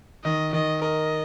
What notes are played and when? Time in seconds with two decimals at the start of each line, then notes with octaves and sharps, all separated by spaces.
0.24 D#3 D#5
0.53 D#3 D#5
0.82 A#4 D#5